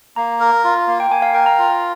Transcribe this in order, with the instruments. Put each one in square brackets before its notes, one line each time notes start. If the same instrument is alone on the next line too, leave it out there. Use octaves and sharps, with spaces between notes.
[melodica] A#3 [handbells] A#5
[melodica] A#4
F4
A#3
[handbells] G5
[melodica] A#3 [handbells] G#5
[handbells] F5
[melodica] A#4 [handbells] G5
[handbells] A#5
[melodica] F4